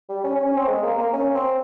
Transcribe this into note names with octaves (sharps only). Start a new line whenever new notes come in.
G3
C#4
C#4
C#4
C4
G#3
A#3
A#3
C#4
C4